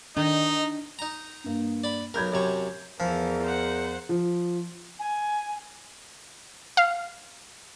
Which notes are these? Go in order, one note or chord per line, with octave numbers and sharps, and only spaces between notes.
D#3 D4 D#4
D#4 A#5
G2 A#3
D5 B5
B1 A#4 B5 G6 G#6
F#2 C3 C#5
E2 E3 F3 A#4
C5 F#5
F3
G#5
F5